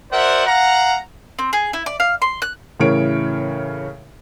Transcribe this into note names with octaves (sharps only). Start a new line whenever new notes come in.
F#4 A#4 C5 D5 E5 F#5
F5 F#5 A#5
C4
G#4
E4
D5
F5
C6
F#6
A2 C#3 E3 A#4 C#5 D7